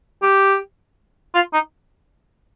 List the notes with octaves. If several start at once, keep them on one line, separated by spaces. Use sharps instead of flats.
G4
F4
D#4